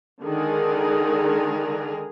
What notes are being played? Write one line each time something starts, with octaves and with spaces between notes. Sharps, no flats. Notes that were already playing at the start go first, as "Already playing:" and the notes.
D3 D#3 G#3 G#4 A#4